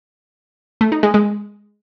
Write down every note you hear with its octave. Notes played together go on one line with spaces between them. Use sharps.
A3
D#4
G#3
G#3